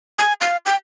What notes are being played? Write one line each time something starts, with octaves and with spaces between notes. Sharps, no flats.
G#5
F5
G5